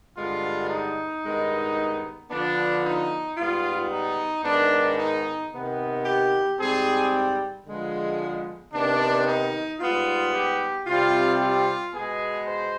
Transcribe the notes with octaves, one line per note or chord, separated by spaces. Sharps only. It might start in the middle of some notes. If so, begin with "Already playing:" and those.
G2 D3 G#3 B3 F4
D#4
G2 D#3 G#3 B3
D3 F3 B3 D4
D#4
G#2 G3 B3 F4
D#4
G#2 D#3 B3 D4
D#4
C3 D#3 B3
G4
G#2 G3 C4 G#4
D3 F3 G#3 B3
C3 D#3 B3 D4
D#4
G#2 G3 B3 F4
G4
C3 G3 C4 F4
F4
B2 G#3 B3 G#4
C5